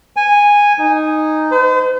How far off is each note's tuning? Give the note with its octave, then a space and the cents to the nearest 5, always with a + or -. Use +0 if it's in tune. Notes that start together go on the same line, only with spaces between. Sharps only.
G#5 -10
D#4 -5
C5 -45